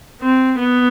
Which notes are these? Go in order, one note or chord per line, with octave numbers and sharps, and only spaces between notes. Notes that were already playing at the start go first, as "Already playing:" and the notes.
C4
B3